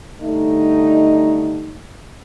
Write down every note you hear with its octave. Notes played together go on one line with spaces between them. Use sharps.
D3 G3 A3 D#4